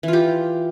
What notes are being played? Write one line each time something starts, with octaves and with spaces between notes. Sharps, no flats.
E3 F4 G4